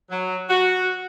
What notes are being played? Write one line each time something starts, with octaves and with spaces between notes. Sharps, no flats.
F#3
F#4